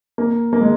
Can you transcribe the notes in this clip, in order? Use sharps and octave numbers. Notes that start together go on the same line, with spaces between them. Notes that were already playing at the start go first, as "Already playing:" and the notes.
A#3
A#3
G#3